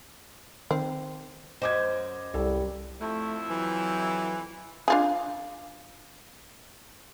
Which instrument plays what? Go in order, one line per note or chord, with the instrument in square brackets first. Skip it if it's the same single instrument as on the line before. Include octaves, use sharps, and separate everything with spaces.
[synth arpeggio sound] D#3 [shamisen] C4
[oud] F#2 C5 [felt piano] D#5 D6 G#6
[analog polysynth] C2 [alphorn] G3 [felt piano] A4
[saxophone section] F2 E4 [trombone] A3
[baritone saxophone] E3 [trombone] F#3
[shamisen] D4 F4 G#4